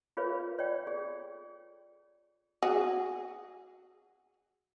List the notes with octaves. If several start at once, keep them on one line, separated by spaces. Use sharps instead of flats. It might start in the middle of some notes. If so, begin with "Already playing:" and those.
F4 G#4 A#4 B4 C#5 F5
C#5 D5 G5
G#4
F#4 G#4